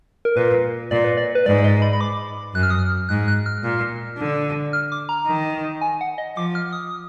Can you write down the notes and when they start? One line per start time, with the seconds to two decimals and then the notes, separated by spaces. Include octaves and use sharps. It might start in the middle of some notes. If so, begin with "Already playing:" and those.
0.25 A#4
0.36 A#2 B4
0.91 A#2 D5
1.04 B4
1.17 D5
1.35 B4
1.46 G#2 D5
1.64 D#5
1.82 B5
1.93 B5
2.01 D6
2.55 F#2 F#6
2.63 F6
2.70 D#6
2.79 F6
3.09 G#2 F#6
3.28 F#6
3.46 F6
3.64 A#2
4.19 D3
4.73 F6
4.92 D6
5.09 A#5
5.27 D#3
5.81 G#5
6.01 F#5
6.18 D#5
6.36 F3 D6
6.55 F6
6.73 D#6